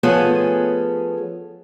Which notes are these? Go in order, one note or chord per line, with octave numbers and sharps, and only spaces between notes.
F3 A3 B3 C#4 G#4 A4